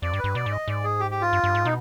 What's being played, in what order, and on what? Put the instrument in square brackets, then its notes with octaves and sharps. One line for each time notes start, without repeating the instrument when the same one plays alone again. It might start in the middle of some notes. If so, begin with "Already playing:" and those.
[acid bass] F2 [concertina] D5
[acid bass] G2
[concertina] B4
[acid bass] G2
[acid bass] B2 [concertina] D5
[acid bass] G#2
[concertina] D#5
[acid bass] G#2 [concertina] D5
[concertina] G#4
G4
G4
F4
[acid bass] G2
G2
G#2
[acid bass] B2 [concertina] D#4